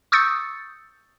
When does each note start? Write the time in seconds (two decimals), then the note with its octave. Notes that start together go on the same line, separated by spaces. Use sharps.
0.12 C#6 D#6 E6 G6 A6 C#7